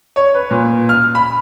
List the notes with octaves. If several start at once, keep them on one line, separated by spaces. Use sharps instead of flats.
C#5
B4
A#2
F6
B5